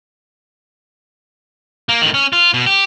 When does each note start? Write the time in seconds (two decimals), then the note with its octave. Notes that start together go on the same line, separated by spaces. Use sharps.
1.89 A#3
2.02 A2 D#3
2.14 C#4
2.33 F4
2.54 B2
2.66 G4